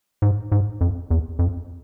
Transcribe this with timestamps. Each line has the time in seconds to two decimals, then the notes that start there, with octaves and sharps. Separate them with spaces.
0.22 G#2
0.52 G#2
0.81 F2
1.11 E2
1.39 F2